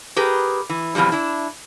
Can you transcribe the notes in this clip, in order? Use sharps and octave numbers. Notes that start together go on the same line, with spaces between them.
G4 G#4 A#4 B4
E3
F2 B2 E3 F3 G3
D4 E4